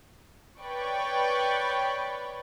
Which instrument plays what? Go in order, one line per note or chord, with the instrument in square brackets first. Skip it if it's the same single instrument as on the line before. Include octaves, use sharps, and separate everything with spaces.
[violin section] B4 C#5 D5 G5 B5 C#6